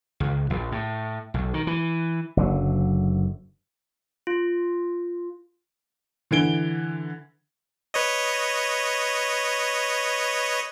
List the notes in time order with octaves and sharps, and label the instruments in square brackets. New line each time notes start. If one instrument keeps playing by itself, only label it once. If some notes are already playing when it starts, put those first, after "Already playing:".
[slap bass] C#2
A#1
A2
B1
D#3
E3
F#1 D3 F#3
[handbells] F4
[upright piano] D3 E3 D7 G7
[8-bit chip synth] B4 C#5 D#5